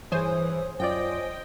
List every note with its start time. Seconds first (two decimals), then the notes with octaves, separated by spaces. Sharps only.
0.12 G2 E3 G#4 C5 C#5 G#5 D#6
0.80 F#2 F4 D5 D#5 G5